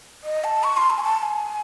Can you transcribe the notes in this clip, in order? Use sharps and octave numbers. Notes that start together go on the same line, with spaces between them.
D#5
A5
C#6
C6
A5
G#5
A5
G#5